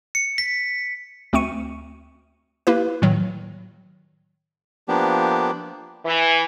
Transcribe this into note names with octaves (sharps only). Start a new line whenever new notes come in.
C#7
B6
D2 A3 C4 C#6 C#7 D#7
A#3 E4 G4 B4
A2 D#3 F#3
F3 A#3 B3 D4 G4
E3